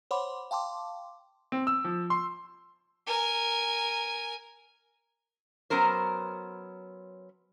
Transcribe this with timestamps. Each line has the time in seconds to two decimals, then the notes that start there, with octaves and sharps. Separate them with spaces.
0.11 C5 C#5 F#5 B5 C6 D6
0.51 F5 G5 A5 C6 D6
1.52 C4
1.67 E6
1.84 F3
2.10 C6
3.06 A#4 G#5
5.70 F#3 B3 C#4 A#4 C5